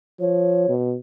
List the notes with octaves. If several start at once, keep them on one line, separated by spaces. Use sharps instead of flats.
F3 C#5
B2